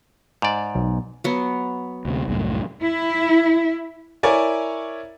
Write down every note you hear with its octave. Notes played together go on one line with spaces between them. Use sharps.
G#2 D5
B1
F#3 B3
D2 C3
C2 F#2 A2
E4
E4 A#4 C#5 D5 G#5